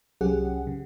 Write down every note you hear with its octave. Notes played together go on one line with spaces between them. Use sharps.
C2 F#3 C#4 G4 G#4 F#5
C#3